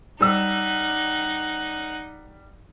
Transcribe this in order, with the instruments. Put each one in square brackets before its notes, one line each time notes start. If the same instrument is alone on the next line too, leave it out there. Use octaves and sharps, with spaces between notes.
[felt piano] G3 E6 [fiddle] D#4 F#5